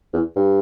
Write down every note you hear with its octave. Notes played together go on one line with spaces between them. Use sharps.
E2
G2